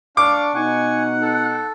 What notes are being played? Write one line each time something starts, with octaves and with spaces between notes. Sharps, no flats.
D4 F5 C#6 D6
B2 D#4 F#5 G#5 C#6
A4